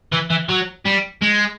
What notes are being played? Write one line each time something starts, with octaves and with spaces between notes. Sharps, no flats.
E3
E3
F#3
G3
G#3